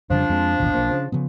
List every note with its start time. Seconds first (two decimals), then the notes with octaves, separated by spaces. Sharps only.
0.10 F2 C#3 F3 G3 D4
0.29 F2 G#3 C4
0.59 A1 D#2 B2
0.74 B1 A#3
0.91 C#3
1.12 C#3 F3 B3